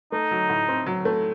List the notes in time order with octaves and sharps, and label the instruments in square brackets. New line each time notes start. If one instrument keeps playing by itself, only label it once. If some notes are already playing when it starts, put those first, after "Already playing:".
[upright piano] A3 [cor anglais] D#4
[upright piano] F#3
A2
C4
F#3
A3